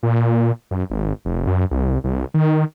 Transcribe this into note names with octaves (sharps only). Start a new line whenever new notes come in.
A#2
F#2
G#1
F1
F#2
C2
C2
D#3